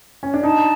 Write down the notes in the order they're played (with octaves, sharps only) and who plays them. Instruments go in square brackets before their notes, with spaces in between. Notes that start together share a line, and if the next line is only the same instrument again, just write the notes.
[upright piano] C#4
D4
[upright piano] D#4 [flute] A5